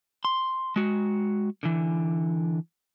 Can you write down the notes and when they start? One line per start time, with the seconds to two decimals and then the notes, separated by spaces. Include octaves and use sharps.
0.25 C6
0.76 G#3 F#4
1.63 D3 E3